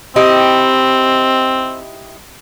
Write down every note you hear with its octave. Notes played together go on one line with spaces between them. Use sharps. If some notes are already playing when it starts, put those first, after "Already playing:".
C4 D#4 E4 G4